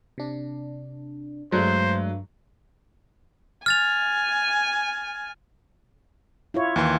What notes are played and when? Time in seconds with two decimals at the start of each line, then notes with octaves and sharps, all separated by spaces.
0.18 C3 D4
1.52 G2 F#3 G#3 A3 D4 C5
3.66 G#5 F6 A6 F7
6.54 E4 F4 C#5
6.76 D#2 E3 C6